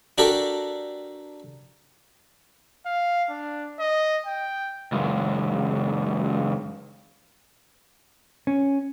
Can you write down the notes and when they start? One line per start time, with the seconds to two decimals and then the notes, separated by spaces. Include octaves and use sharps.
0.18 D4 F#4 G4 A4 A#4
2.86 F5
3.30 D4
3.79 D#5
4.26 G5
4.92 C#2 F#2
8.47 C#4